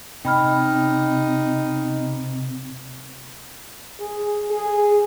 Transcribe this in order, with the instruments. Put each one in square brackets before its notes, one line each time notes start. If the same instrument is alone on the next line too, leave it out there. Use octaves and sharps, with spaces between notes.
[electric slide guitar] C3 [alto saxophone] D#4 [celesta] G5 B5 F6
[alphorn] G#4
G#4